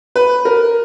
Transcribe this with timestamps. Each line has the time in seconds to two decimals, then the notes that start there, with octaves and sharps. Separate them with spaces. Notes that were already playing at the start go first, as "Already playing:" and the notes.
0.16 B4
0.45 A#4